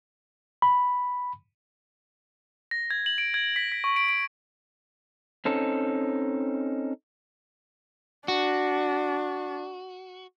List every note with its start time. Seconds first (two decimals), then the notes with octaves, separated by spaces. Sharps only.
0.62 B5
2.71 A#6
2.91 G#6
3.06 F#7
3.18 D7
3.34 G#6
3.56 B6
3.72 B6
3.84 C#6
3.96 D7
4.09 D7
5.45 C4 C#4 D#4 A4
8.28 D4 F#4